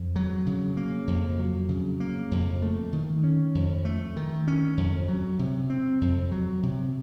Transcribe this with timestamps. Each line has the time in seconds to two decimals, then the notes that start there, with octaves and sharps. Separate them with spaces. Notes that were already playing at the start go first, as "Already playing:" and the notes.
Already playing: F2
0.16 F#3
0.46 C#3
0.77 A#3
1.07 F2
1.39 F#3
1.69 C#3
2.00 A#3
2.31 F2
2.62 A3
2.93 D#3
3.24 C#4
3.55 F2
3.85 A3
4.17 D#3
4.48 C#4
4.77 F2
5.08 F#3
5.39 C3
5.70 C4
6.01 F2
6.31 F#3
6.63 C3